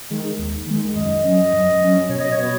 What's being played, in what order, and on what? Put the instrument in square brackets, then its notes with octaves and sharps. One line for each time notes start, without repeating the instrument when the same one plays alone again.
[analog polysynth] D#3 G#3
D#2
D#3 G#3
[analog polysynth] F#2 [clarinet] D#5
[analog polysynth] F#3 C#4
F#2
F#3 C#4
[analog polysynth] B2 [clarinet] C#5
[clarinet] D#5
C#5
[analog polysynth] F#3 B3